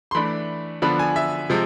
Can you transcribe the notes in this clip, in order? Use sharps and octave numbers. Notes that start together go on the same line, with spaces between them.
C6
E3 A3 D4 B5
D3 F3 B3 D4 B5
G#5
E5
C3 F3 G#3